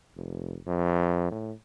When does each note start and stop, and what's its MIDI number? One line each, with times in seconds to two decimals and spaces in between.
0.16 0.57 29
0.67 1.30 41
1.31 1.52 45